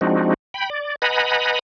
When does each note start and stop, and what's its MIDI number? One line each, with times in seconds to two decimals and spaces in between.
0.01 0.34 53
0.01 0.34 56
0.01 0.34 60
0.01 0.34 62
0.01 0.34 63
0.01 0.34 66
0.54 0.70 79
0.54 0.70 83
0.70 0.96 74
1.02 1.59 71
1.02 1.59 75
1.02 1.59 78
1.02 1.59 80
1.02 1.59 82
1.02 1.59 83